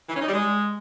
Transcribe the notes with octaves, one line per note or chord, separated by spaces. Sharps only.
E3
C#4
D#4
G3
G#3